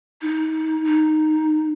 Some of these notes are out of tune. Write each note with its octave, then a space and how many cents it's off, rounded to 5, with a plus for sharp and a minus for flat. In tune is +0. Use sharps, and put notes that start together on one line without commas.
D#4 +25
D#4 -5